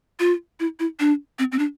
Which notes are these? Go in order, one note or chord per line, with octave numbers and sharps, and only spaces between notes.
F4
E4
E4
D4
C4
C4
D4